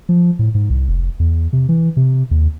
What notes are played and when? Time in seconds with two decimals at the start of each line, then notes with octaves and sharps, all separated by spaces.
0.09 F3
0.39 A2
0.55 G#2
0.70 C2
0.88 F1
1.20 E2
1.53 C3
1.69 E3
1.97 C3
2.31 D#2